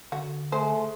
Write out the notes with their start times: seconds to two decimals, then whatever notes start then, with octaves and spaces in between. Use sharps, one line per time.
0.12 D3 F#4
0.52 G#3 A3 C5